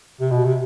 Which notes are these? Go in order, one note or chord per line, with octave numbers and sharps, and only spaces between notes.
C3
B2
C3